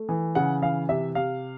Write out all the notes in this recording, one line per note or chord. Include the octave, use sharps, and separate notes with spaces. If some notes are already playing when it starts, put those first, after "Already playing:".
Already playing: A3
E3
C#3 F#5
E3 F5
C3 E5
C3 F5